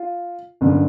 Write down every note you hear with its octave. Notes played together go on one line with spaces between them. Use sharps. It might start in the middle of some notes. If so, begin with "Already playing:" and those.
Already playing: F4
G1 F#2 D3